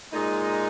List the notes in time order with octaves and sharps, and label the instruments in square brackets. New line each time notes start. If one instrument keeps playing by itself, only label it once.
[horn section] A#2 G#3 D#4